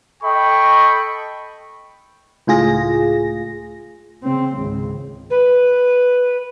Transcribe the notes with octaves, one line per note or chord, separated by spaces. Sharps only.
A4 D#5 G5 B5 C#6
C#2 A2 F4 G#4 A#6
C#3 C4
G#1 C#2
B4